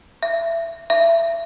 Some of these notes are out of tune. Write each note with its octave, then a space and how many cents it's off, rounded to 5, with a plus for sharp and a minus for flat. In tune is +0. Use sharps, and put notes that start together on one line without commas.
E5 +20
E5 +25